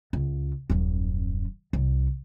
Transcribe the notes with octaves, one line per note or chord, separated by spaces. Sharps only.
C#2
D#1 F#2
C2